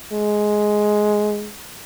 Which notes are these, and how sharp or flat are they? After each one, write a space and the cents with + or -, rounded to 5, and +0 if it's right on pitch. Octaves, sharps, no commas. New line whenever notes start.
G#3 +10